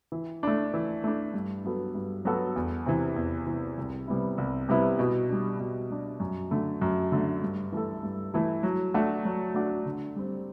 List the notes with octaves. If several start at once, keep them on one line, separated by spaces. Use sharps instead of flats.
E3
A3 D4
E3
A3 D4
G2
F#3 B3 F#4 A4
G2
F#3 B3 F#4 A4
E2
C3 E3
E2
C3 E3
C2
C3 G3 B3 E4
C2
C3 G3 B3 E4
B2
G3 D4
B2
G3 D4
F#2
D3 A3
F#2
D3 A3
G2
E3 A3 E4 A4
G2
E3 A3 E4 A4
F#3
A3 D4 F#4
F#3
A3 D4 F#4
D3
G3 C4